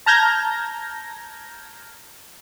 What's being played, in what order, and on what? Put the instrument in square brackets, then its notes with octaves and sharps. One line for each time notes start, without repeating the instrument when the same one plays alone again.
[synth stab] A5 A#5 F6 G6 G#6 A#6